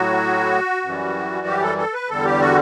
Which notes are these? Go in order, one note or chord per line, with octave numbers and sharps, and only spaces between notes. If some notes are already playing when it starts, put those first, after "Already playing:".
Already playing: A2 F#3 F#4
F#2 E3 G3
G4
A4
A4
B4
E2 D3 G3 A4
G4
F#4